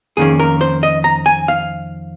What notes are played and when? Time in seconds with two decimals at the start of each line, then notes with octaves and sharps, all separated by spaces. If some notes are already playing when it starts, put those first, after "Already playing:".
0.17 F2 D#3 A#3 C#4 G#4
0.39 A#4
0.61 C5
0.83 D#5
1.04 A#5
1.26 G#5
1.48 F5